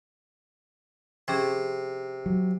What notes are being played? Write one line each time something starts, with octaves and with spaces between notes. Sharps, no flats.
C3 F3 C#4 G#4
F#3